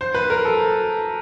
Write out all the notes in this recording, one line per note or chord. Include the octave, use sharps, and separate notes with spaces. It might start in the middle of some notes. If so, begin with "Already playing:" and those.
C5
B4
A#4
A4